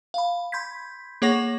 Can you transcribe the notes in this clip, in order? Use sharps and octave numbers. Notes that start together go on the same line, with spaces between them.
F5 B5
B5 C6 G6 G#6 B6
A#3 G#4 C#5 F#5 C#6 A#6